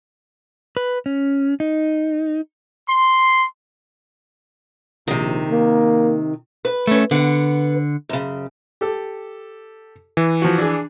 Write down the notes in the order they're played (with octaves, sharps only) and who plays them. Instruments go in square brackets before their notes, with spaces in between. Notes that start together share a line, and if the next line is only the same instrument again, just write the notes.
[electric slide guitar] B4
C#4
D#4
[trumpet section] C6
[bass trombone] A#1 [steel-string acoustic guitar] C3 D#3
[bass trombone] A#3
[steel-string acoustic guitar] B4
[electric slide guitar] A3 C#4
[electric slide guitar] D3 [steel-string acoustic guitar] B3 F#5
[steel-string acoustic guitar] F#2 C#3
[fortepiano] G4 A4
[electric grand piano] E3
[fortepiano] F3 F#4
D4 G#4